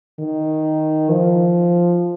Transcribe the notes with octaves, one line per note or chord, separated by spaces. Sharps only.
D#3
F3